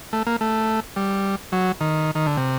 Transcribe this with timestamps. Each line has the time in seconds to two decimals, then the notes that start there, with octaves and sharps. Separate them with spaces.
0.13 A3
0.27 A#3
0.41 A3
0.96 G3
1.52 F#3
1.81 D#3
2.15 D#3
2.26 D3
2.37 C3